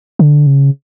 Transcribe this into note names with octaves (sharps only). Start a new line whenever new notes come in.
D3
C#3